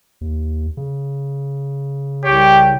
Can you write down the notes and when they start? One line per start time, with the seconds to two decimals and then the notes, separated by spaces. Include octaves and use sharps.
0.21 D#2
0.77 C#3
2.24 C2 G4 C#5 G5